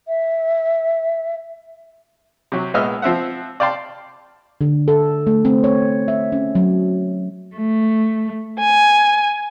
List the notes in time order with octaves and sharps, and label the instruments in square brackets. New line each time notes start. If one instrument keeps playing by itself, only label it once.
[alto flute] E5
[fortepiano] C3 F#3
A#1 G#3 B3 D#5 E5 F6
F3 C4 E5 F#5
D5 F5 G5 A5 C6
[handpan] D3
A4
A3
C4
C#5
E5
C#4
F#3
[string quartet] A3
G#5